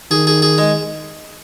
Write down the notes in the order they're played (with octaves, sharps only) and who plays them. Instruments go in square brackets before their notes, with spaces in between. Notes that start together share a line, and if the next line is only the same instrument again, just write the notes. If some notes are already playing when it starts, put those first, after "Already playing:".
[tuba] D#3 [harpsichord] G#4
[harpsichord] G#4
G#4
G#3